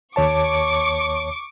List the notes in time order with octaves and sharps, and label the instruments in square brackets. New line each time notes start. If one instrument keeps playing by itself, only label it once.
[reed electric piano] D#2 C#5 A5 [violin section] C#6 D6